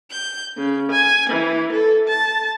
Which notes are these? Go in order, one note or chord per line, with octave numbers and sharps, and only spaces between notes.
G6
C#3
G#5
E3
A4
A5